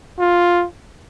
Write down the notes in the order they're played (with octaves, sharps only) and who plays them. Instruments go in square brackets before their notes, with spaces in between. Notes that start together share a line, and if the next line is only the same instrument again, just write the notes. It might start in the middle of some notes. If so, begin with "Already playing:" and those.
[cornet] F4